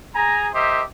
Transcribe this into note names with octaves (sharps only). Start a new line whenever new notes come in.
G#4 G#5 A#5
G4 A#4 C5 D#5 E5